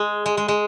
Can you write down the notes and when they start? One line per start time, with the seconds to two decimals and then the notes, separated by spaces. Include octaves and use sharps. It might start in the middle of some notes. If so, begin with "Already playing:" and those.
Already playing: G#3
0.26 G#3
0.37 G#3
0.48 G#3